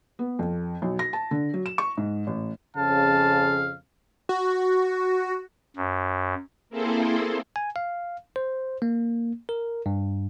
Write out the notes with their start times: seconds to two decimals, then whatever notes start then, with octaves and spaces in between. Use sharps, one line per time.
0.19 B3
0.39 F2
0.82 B1
0.99 A#6
1.13 A5
1.31 D3
1.54 F#3
1.66 E7
1.78 C#6
1.97 G#2
2.27 A1
2.77 F2 C#3 F5 A5
4.29 F#4
5.76 F#2
6.70 A#3 C4 E4 G#4 A4 C5
7.56 G#5
7.76 F5
8.36 C5
8.82 A#3
9.49 A#4
9.86 G2